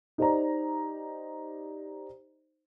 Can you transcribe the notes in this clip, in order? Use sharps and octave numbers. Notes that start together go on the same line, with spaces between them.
D#4 G4 C5 D5 D#5 A#5